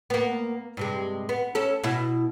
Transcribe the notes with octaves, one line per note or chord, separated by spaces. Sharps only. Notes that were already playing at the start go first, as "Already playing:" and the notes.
A#3 B3
G2 C3 G#3
B3
C#4 A4
B2 E4